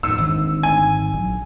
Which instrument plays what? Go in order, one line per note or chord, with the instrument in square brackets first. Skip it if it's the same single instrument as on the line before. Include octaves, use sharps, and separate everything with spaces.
[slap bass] E2 A2 [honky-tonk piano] E6
[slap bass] G#1 [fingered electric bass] G#2 D3
[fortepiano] G#5
[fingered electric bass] A#1 F#3